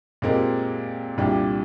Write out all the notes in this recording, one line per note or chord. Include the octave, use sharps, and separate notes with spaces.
A#2 G#3 C4 G4 A#4
C2 A#2 G3 D4 G4